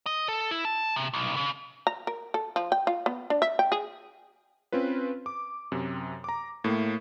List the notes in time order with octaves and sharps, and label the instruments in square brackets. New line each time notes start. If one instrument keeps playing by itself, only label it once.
[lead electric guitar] D#5
A4
E4
A5
C3
B1
C#3
[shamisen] A#5
A#4
A4
F3
G5
F4
B3
D4
E5
G5
G#4
[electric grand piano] C4 C#4 F4 B4
D6
F#2 C3
A#5 D6
A2 A#3